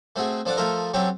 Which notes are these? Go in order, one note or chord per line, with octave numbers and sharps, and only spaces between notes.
A3 C4 F#4 G#4
F3 D4 A4 D5 F#5
F3 A3 F4 A4 A#4 D#5
F#3 C4 C#4 G4 A4